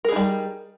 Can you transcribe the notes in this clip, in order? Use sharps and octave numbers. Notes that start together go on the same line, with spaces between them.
G3 D#4 G#4 A#4